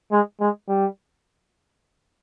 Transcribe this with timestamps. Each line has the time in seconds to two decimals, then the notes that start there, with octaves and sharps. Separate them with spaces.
0.12 G#3
0.41 G#3
0.69 G3